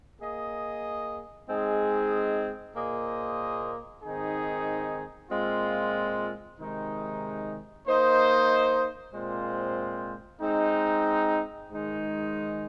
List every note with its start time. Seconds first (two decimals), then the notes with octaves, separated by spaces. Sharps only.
0.19 A#3 G#4 D#5
1.48 G#3 C4 D#4 G#4
2.75 A#2 A#3 G#4 C5 D#5
4.02 G#2 D#3 C4 D#4 G#4
5.30 A#2 G#3 C4 F4
6.58 C3 D#3 G#3 D#4
7.85 A#3 D#4 C5 D#5
9.13 A#2 G#3 C4 F4 C5
10.41 G#3 C4 D#4
11.68 G#2 D#3 G#3 D#4